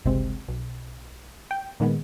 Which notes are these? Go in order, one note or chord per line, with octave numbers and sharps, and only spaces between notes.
G1 C#2 C3 G#3 C4
B1
G5
A#2 D#3 G#3 B3